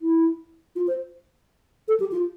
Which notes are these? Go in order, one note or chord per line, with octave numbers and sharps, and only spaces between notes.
E4
F4
C5
A4
G4
F4